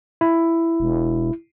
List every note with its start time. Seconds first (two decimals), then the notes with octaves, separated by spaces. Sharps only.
0.21 E4
0.80 E1